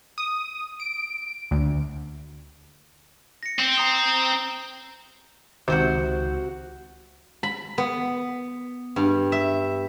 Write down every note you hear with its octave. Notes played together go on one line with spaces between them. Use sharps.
D#6
D7
D2
A#6 C#7
C4
A#5 D#6 F7
A#5 G7
C#2 C3 D#3 F#4 C5 F#5
B5
B3
G2
E5